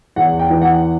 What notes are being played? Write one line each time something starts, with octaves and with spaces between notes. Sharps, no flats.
E2 F#5
G5
E3
F#5